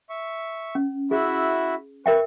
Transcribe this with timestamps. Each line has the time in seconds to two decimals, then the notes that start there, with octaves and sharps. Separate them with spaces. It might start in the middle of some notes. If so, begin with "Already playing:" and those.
0.10 E5 C#6
0.75 C#4
1.11 E4 F#4 G#4 E5
2.06 A#4 B4 E5 G5 C#6